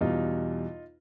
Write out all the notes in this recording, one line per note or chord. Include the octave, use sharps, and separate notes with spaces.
E2 B2 G3 D#4 F4